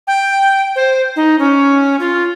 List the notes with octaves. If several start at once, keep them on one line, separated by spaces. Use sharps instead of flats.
G5
C5
D#4
C#4
F4